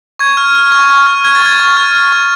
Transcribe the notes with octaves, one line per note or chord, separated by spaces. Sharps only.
C#6 G#6
F6
F6
C#6
C#6
F6
F6 G#6
A6
C#6 G#6
C#6
F6
F6
C#6